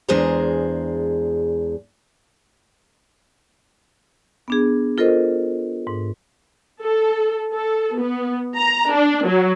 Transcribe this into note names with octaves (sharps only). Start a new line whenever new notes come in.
E2 G#3 D4 G#4 C5 A#5
B3 D4 G#4
F4 A4 A#4 C5 D#5
G#2
A4
A4
B3
A#5
D4
F#3